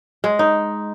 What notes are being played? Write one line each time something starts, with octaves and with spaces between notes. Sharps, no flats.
G#3
D#4